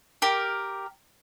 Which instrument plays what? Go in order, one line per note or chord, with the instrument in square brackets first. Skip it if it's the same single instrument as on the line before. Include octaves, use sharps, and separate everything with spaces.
[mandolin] G4 A#4